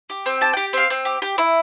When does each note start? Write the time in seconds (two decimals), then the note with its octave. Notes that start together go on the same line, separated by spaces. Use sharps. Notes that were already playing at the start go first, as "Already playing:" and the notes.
0.10 G4
0.26 C4
0.41 G4 A5
0.54 G4 G5
0.73 C4 F5
0.90 C4
1.05 G4
1.22 G4
1.38 E4